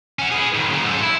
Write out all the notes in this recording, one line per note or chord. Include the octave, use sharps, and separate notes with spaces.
C#4 F#4
B3 G#4
G#2 D#3
C#3 F#3
G#2 A4
E4